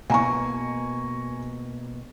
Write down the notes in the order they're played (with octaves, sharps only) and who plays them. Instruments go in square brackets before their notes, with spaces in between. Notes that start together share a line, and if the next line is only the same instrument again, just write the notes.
[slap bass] B2 A#3 [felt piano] G#5 A#5 C#6